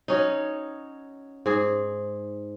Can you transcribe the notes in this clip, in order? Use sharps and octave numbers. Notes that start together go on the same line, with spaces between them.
F#3 C#4 D#4
G#2 G#4